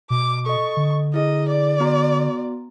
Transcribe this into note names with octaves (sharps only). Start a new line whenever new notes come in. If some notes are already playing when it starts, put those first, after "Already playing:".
B2 D6
A4 D#5 C#6
D3
E4 G#4 D#5
D5
B3 F#4 A#5